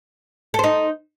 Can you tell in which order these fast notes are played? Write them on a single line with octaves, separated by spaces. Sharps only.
A4 C5 D#4